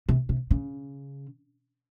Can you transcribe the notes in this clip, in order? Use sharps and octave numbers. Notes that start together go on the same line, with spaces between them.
C3
C3
C#3